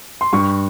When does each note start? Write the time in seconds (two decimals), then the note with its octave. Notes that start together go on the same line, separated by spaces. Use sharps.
0.21 C6
0.33 G2 C#6